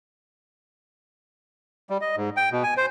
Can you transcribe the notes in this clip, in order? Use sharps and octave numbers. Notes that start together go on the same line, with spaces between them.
G3
D#5
G#2
G5
B2
G#5
C5